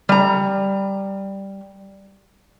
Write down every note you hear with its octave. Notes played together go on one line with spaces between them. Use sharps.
G3 A#5